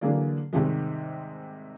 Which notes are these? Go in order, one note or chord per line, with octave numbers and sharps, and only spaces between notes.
D3 E3 F#3 A#3 G#4 D5
G#2 C3 D#3 G3 G#3